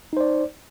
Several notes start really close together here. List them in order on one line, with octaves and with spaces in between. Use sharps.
D#4 C5 D5